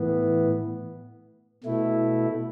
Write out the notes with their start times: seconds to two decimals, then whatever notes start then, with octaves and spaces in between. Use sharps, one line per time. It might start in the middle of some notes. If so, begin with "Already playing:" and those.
Already playing: A2 E3 B3
1.64 B2 A3 E4